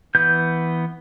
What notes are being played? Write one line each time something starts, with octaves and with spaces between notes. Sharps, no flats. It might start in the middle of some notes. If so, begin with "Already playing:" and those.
E3 B3 G6